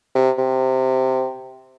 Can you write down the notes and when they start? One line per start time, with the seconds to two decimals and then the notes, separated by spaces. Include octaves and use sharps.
0.15 C3
0.38 C3